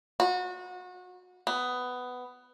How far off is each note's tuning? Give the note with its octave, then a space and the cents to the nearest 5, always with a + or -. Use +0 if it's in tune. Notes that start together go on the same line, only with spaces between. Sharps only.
F#4 -30
B3 +15